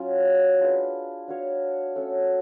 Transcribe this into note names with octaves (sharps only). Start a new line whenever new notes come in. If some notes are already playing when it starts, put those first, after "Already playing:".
Already playing: F#3 C#4 F4
D4 F4 G#4 B4
D4 F#4 C#5 F5
A3 C#4 F#4 A4